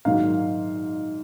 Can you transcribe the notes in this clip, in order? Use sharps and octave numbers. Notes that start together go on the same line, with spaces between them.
A#1 G#2 D#3 F#3 F5